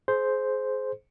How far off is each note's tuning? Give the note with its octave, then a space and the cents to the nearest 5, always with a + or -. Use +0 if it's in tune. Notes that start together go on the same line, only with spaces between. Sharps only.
G#4 +30 C5 +0